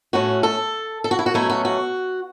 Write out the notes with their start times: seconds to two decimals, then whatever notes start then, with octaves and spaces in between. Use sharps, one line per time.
0.13 A2 A3 C#4 F#4
0.43 A4
1.04 A4
1.11 F#4
1.19 E4
1.26 F#4
1.34 B2 F#3 A3 C#4 E4
1.50 F#4
1.65 F#4